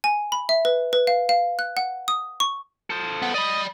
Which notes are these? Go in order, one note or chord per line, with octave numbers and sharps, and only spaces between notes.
G#5
B5
E5
B4
B4
F5
F5
F#6
F#5
D#6
C#6
A4 C5
B3
D5 D#5 B5